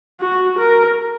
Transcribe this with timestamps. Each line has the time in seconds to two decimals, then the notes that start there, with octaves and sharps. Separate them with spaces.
0.20 F#4
0.59 A#4